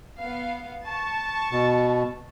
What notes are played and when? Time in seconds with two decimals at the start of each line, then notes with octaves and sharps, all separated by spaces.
0.20 B3 F5
0.85 A5 C#6
1.52 B2